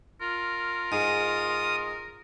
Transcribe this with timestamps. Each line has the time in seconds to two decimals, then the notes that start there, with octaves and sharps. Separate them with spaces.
0.21 F4 A#4
0.92 G#2 D#6